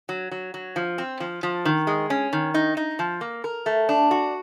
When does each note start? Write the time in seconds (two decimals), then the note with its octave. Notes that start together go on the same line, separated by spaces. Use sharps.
0.09 F#3
0.31 F#3
0.54 F#3
0.76 F3
0.98 C4
1.20 F3
1.43 F3
1.65 D#3
1.87 G#3
2.10 C#4
2.33 D#3
2.54 D#4
2.77 D#4
2.99 F3
3.21 A#3
3.44 A#4
3.66 A3
3.89 D4
4.11 F#4